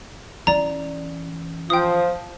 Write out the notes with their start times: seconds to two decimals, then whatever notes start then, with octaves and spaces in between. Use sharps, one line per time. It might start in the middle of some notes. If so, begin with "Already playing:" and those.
0.47 E3 C#4 D5 A#5
1.70 F3 C5 G5 D#6